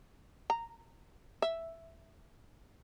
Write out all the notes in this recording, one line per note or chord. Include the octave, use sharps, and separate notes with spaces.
A#5
E5